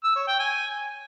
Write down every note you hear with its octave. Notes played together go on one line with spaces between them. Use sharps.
E6
C#5
G5
G#5